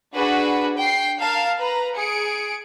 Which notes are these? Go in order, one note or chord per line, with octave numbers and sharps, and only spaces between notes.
D4 F#4 G#4 B4
G5 C7
A#4 F5 A5
B4 A#5
G#4 C#7 D7